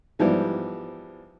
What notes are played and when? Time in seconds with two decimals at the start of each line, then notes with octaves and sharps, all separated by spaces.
0.19 G#2 E3 F3 G3 B3